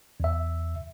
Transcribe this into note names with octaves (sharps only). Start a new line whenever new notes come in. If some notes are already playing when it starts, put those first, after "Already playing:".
E2 E5